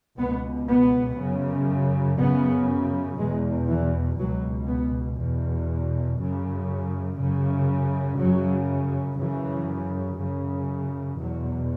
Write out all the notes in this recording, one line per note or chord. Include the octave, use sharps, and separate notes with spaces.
C#2 B2 B3
B3
F#2 C#3
F#2 C#3 B3
E2 B2 G#3
E3
C#2 B2 F#3
B3
E2 B2
F#2 C#3
F#2 C#3
F#2 C#3 F#3
F#2 C#3 E3
F#2 C#3
E2 B2 F#3